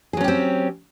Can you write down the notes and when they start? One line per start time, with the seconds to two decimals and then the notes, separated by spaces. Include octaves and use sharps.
0.13 G#4
0.17 F#3
0.21 C#4
0.24 G4
0.28 C4